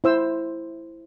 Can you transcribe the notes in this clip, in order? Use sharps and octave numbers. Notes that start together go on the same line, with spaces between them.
E4 C5 E6